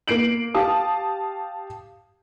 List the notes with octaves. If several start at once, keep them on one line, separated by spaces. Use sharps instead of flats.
A#3 C7 D7 F#7
G4 F5 A5 D#6